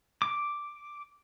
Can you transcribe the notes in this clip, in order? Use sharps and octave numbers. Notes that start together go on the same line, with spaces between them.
D6